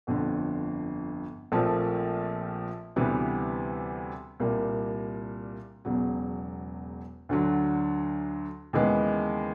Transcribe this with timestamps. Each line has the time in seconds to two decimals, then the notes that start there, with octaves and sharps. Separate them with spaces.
0.07 G1 F2 D3
1.52 A#1 A#2 F3 A3 C4
2.96 D2 C3 E3 G3 B3
4.40 C2 A#2 G3 A#3
5.85 E1 E2 C#3 F#3
7.29 D2 D3 F#3
8.73 D#2 C#3 E3 G#3 B3